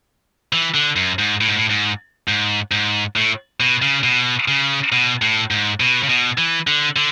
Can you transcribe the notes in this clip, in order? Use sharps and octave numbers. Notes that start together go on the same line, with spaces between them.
E3
D3
F#2
G#2
A2
G#2
A2
G#2
G#2
G#2
A2
B2
C#3
B2
C#3
B2
A2
G#2
B2
C#3
B2
E3
D3
D3